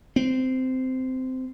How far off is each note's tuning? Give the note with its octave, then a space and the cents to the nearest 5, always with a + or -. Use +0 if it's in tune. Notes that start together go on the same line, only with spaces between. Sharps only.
C4 -15